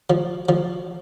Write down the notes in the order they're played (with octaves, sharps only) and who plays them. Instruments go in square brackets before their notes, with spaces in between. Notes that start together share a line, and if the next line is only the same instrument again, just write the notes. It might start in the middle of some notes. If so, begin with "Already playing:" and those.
[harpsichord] F3
F3